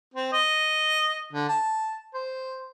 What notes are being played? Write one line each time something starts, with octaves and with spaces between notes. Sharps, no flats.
C4
D#5
D3
A5
C5